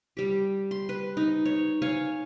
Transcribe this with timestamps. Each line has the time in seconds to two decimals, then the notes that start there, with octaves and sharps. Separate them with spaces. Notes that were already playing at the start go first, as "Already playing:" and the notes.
0.17 G3 G4
0.71 C6
0.89 B4
1.17 D#4
1.45 C#5
1.82 C#5 F5 G#5